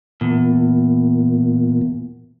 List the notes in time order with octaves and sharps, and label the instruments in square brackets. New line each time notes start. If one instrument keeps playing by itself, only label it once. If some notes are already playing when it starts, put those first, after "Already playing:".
[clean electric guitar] E2 [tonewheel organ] A#2